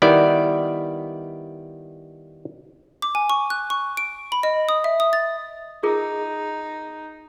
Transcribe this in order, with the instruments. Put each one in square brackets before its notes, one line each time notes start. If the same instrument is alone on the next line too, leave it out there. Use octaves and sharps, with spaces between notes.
[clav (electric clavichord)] D#3 G3 B3 E4 D5
[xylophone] D6
G#5
C#6
F#6
C#6
D7
B5
D#5
D#6
E5
D#6
A6
[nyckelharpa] D#4 [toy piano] F4 G#4 A#4